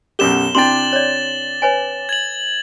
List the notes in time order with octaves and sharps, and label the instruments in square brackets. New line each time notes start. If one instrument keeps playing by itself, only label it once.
[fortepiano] B1 F#2 G4 [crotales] E7 G7
[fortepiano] C3 D4 G5 [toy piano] E4 C6 [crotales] A6 F#7
[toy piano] C#5 D5
B4 C#5 G#5
[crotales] G#6 F#7